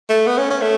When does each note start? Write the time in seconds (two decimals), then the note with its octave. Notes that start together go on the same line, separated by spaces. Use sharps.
0.09 A3
0.27 B3
0.38 C#4
0.50 C#4
0.62 A3